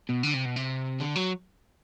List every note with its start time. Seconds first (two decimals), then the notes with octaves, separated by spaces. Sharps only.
0.09 B2
0.23 D3
0.34 C3
0.45 B2
0.56 C3
1.00 D3
1.16 F#3